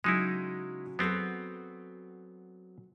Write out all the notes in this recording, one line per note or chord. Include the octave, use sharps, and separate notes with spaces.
C#3 F#3 G#3 D#4 E4
F#3 B3 C4 F#4 G#4 A4